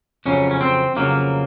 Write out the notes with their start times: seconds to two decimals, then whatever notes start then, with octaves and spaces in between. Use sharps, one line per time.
0.26 F2 C#3 F#3 C#4
0.51 C#4
0.61 C4
0.97 F2 C#3 F#3 A#3